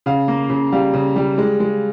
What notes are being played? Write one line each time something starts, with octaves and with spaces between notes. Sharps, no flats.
C#3 F5
A#3
C#3
G3 F5
C#3
G3
G#3
G#3